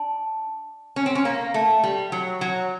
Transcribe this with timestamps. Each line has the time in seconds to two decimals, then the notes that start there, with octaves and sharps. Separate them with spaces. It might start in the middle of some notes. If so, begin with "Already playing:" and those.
Already playing: D4
0.96 C#4
1.06 C4
1.15 C#4
1.25 A#3
1.54 A3
1.84 G3
2.12 F#3
2.41 F#3